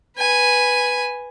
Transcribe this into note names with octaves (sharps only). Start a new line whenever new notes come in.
B4 G#5